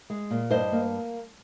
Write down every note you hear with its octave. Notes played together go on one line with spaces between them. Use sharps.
G#3
A#2
G2 C5 D#5
A#3